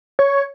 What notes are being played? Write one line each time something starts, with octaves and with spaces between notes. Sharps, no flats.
C#5